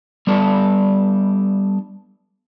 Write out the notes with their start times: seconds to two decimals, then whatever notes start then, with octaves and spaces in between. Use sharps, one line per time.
0.27 G3 B3 D4 A4